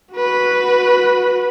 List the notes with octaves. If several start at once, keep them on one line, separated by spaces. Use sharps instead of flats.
F#4 B4